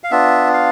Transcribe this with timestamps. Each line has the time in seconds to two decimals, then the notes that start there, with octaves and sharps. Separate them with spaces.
0.04 F5
0.11 B3 D4 F4 E5
0.53 F5